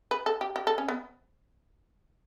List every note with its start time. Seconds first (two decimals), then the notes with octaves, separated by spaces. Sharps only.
0.11 B4
0.26 A4
0.41 G4
0.56 G4
0.67 A4
0.78 C#4
0.88 B3